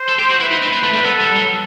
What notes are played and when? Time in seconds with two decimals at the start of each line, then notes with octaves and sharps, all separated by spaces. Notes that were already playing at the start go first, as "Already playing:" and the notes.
Already playing: C5
0.09 A4
0.19 G4
0.30 F#4
0.40 E4 B4
0.51 D#4
0.62 C4
0.73 B3
0.83 A3
0.94 G3
1.05 B3 A4
1.21 G3
1.37 F#3